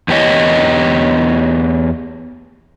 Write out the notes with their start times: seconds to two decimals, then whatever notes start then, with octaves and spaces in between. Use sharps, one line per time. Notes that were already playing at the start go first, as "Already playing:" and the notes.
0.08 E2 B3 G4 C#5 D#5